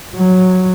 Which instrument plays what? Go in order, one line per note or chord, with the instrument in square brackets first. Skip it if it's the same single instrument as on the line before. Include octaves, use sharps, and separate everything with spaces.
[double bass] F#3